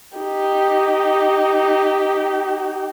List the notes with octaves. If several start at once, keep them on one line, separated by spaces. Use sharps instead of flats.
D#4 G4